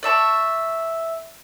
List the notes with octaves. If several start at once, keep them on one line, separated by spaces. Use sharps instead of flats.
D5 E5 A5 C#6